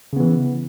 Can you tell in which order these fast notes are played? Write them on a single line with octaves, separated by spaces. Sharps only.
C#3 B3 E3